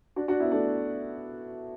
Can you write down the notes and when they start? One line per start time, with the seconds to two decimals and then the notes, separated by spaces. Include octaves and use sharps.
0.16 D4 F#4
0.28 D4 F#4
0.40 B3 E4
0.51 A3 D4